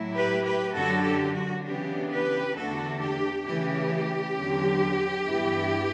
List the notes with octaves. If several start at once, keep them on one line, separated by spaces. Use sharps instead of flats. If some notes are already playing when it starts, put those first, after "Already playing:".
Already playing: A2 F#3 A3 E4
G4 B4
G4 B4
F#2 D3 F#3 F#4 A4
G4
F#4
C#3 E3 B3 D4 G4
G4 B4
E2 D3 A3 D4 F#4 A4
G4
C#3 E3 A3 G4
E2 D3 F#3 C#4
G2 E3 B3 E4